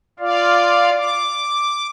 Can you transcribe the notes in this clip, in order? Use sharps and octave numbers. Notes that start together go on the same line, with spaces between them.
F4 D5 F5
D6